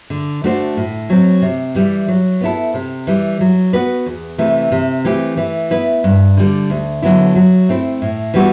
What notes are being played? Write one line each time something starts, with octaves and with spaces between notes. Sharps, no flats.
D3
A3 D4 F#4 C5
A2
F#3 C4
C3
E3 G3
F#3
B3 E4 A4
C3
E3 G3
F#3
B3 F#4 B4
E2
C3 E3 A3
C3
E3 A3 C4 G4
E3
B3 E4 B4
G2
D3 G3
D2
D3 F#3 B3 E4
F#3
A3 C4 E4
A2
E3 G3 B3 F#4